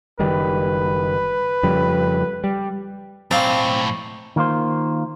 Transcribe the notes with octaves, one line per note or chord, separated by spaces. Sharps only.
F#1 D#3 G3 B4
F2 C#3 G3
G3
B1 A2 C4 D5 F5
D#3 A#3 F4 C5